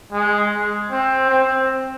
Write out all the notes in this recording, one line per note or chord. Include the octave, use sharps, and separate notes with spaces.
G#3
C4
C4